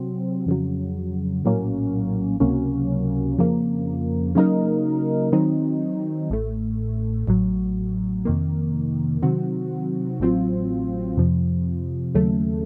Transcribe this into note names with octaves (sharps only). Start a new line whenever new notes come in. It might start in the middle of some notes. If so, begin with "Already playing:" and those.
Already playing: C3 F#3 C4
F2 C#3 F#3
A#1 A2 F#3 A#3 C#4
C#2 C3 F#3 A#3 C#4
F2 C#3 F3 A#3
C#3 F#3 A#3 D#4 A#4
D#3 F#3 C4 D#4
A1 A2 A3
A1 A2 F#3
F2 C3 D#3 A#3
C3 D#3 F#3 C4 F#4
A1 A2 F#3 C4 F4
F2 C3 F3
D#2 C#3 F#3 A3